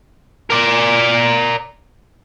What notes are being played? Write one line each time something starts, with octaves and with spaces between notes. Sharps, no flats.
A#4 D5